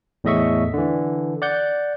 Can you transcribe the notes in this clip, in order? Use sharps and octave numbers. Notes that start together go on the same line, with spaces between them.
E2 A2 D#5 E5 C#6
D3 E3
D5 F#5 G6